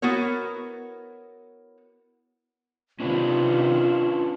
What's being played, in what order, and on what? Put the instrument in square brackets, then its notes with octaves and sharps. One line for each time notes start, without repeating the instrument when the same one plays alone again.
[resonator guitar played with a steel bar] B3 E4 F#4 A#4 C#5
[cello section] C3 D#3 [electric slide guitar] C#4 D4 B4 [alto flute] F4